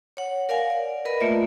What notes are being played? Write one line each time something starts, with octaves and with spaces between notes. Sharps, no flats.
C#5 F#5
A#4 D5 F5 F#5 G#5
D5
A#4 B4 D#5 B5
A3 A#3 F4 D5 E5